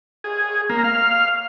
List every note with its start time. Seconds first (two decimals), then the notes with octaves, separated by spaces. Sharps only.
0.24 G#4
0.70 A#3
0.84 F5